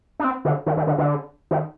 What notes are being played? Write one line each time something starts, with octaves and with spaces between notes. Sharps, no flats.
D4
C4
D3
D#3
D#3
D3
D3
D#3